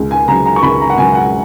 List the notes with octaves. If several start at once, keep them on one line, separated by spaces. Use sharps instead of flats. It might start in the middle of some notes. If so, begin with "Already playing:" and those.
Already playing: C#2
G#5
C#3 F#3 A#5
A#5
C#6
C#2 B5
A#5
F#5
C#3 F#3 G#5
F#5